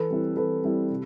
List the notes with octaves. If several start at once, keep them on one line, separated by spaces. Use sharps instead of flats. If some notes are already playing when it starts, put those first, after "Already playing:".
Already playing: E3 A4 B4
G3 C4 E4
E3 A4 B4
G3 C4 E4
C3